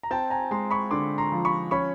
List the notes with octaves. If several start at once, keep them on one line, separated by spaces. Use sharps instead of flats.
A#5
C4 G5 A5
G#5 A#5
G#3 A#5 C6
B5 C#6
D3 C6 D6
A#5 C6
F3
B5 C#6
C#4 B5 C#6